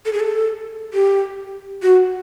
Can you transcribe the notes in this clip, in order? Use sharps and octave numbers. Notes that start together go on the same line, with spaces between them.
A4
G#4
A4
G4
F#4